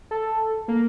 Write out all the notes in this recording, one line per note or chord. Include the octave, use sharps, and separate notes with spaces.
A4
A#3